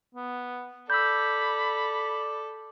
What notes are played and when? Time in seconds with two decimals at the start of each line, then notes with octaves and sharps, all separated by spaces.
0.15 B3
0.90 A4 D5 B5 E6 G6